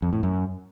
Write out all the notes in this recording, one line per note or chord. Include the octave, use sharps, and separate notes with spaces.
F2
A2
F#2